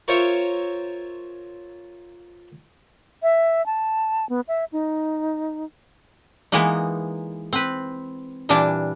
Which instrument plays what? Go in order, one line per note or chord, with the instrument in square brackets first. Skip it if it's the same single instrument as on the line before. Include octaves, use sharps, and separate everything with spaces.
[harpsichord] F4 A#4 C5 C#5 E5
[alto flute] E5
A5
B3
E5
D#4
[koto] E3 G#3 A#3 B3 D#4
C4 B4
A#2 E3 G3 D4 A5